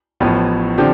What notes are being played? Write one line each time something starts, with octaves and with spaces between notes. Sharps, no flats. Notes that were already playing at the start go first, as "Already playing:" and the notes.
A1 A2 F3 B3
D3 F3 C4 G4